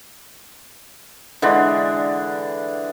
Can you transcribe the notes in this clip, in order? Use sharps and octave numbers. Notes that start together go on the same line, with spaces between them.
D3 E3 G#3 D4